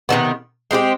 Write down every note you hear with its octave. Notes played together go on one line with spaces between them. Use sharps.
C3 D#3 F#3 B3
G#3 C4 E4 G4